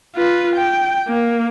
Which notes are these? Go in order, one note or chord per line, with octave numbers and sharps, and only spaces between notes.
F4 B4
G5
A#3